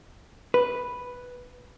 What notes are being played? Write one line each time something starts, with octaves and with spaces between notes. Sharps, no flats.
B4